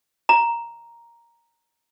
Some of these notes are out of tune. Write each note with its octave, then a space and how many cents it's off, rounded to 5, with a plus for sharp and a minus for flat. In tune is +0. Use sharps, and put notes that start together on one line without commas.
A#5 +0